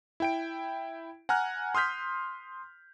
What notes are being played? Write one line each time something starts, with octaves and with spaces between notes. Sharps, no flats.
E4 G5 D7
F#5 G#5 A#5 F6 F#6
C6 D#6 F6 G6 B6